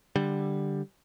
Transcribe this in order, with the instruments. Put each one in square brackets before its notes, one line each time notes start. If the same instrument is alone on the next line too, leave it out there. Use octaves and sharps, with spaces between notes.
[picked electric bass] D3 G3